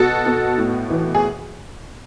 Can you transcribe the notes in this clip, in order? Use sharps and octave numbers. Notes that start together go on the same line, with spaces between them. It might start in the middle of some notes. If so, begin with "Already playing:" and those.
Already playing: B2 F#4 A4
B2
A2
E3
G#4